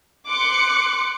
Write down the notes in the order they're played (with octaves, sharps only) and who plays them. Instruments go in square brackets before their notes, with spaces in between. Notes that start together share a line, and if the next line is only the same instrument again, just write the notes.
[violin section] C6 D6 F#6 C#7